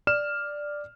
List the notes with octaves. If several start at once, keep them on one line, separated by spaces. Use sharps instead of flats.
D5 F6 E7